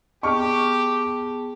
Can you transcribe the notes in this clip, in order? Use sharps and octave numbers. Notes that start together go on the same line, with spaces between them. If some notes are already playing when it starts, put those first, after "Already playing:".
B3 G4 G#4 A5 C#6 F6